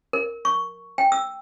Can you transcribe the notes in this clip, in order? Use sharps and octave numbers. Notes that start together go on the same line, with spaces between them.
A#4
C#6
G5
E6